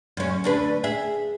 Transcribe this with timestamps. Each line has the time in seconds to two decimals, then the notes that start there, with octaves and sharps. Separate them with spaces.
0.17 F#2 C#4
0.44 D2 D4 B4
0.84 G#4 E5